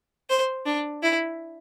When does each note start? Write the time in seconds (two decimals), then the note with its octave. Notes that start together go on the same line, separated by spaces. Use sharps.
0.30 C5
0.66 D4
1.03 E4